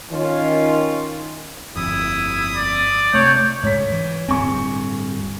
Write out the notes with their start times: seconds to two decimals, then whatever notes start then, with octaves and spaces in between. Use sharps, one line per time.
0.11 D#3 C#4 F4
1.76 G1 F2 E4 D#6
2.55 D5
3.14 C3 A3 C#5 G6
3.63 G#2 C#3 C#5 B6
3.91 E3
4.29 D1 G2 C4 G#5 C#6